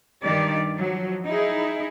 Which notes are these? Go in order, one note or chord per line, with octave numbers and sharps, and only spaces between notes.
G2 D#3 G4 D5
F3 F#3
D#4 E4 G#4